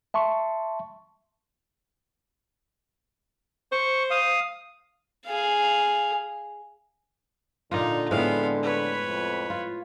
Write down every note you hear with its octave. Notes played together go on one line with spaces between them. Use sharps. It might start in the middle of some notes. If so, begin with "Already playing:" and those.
E5 A5 C6 C#6
C5 C#6
F5 D#6
G#4 F5
A#2 D3 D#4 F4
A2 G#3 B3 C4 F5
B4 C#5
F2
F4